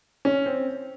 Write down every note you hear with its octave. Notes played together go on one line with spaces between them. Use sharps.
C#4
C4